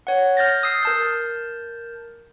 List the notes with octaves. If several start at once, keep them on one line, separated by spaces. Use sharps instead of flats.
C#5 F#5
F6 G6 A6 A#6
D#6 E6 C7
A#4 A5 G6